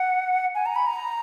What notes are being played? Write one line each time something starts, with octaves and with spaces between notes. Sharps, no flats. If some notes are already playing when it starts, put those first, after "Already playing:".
Already playing: F#5
G#5
A#5
B5
A#5